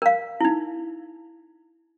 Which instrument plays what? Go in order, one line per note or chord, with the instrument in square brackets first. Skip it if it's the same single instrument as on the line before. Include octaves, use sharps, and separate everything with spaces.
[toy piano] A#4 F5
D#4 E4